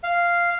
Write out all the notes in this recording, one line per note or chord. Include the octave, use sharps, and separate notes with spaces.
F5